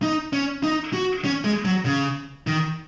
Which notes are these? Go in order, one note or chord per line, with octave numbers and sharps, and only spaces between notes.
D#4
C#4
D#4
F#4
C#4
G#3
F#3
C#3
D#3